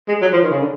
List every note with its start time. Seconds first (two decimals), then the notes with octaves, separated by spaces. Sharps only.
0.08 G#3
0.21 F#3
0.33 F3
0.42 D#3
0.51 C#3
0.61 D3